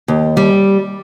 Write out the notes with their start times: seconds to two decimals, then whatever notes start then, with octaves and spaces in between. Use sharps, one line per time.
0.08 D#2
0.37 G3